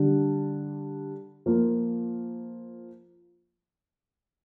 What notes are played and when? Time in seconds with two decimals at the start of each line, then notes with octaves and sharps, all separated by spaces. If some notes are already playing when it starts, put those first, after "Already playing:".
Already playing: D3 G3 D4
1.46 F3 A#3 F4